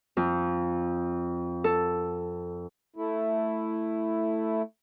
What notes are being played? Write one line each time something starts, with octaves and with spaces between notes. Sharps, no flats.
F2
A4
A3 E4